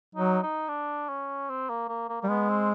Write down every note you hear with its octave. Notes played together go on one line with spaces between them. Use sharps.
F#3 D#4
D#4
D4
C#4
C4
A#3
A#3
A#3
G3 A#3
G#3 B3
C4